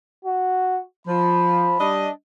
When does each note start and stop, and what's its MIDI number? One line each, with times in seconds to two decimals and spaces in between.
0.25 0.80 66
1.07 1.74 53
1.07 1.90 83
1.80 2.08 55
1.80 2.08 62
1.80 2.08 75